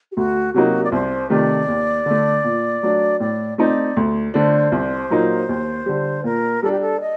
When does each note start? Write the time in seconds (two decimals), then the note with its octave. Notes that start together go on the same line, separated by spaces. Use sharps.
0.12 G4
0.16 D2 F#4
0.54 C3 F#3 A#3 D#4 F#4
0.84 D5
0.92 C2 C5
1.30 C3 D#3 A3 D5
1.68 D#2
2.06 D3 A3
2.44 A#2
2.83 F#3 A3 D4
3.20 A2 D5
3.58 A3 C4 D#4 D5
3.97 D2
4.34 D3 A3 D4 C5
4.72 C2
5.10 A#2 F#3 A#3 D#4
5.49 D#2
5.86 D3 G3
6.24 A#2 A#4
6.63 G3 D4 A4
6.72 G4
6.81 A4
7.01 D#5